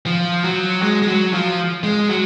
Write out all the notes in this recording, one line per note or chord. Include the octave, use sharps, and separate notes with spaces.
F3
F#3
G#3
G#3
F#3
F3
G#3
F#3